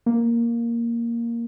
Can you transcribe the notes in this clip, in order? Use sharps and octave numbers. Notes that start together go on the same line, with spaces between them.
A#3